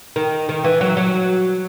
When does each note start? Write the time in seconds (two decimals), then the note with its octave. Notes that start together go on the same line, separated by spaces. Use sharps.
0.16 D#3
0.49 D#3
0.64 E3
0.81 F#3
0.97 F#3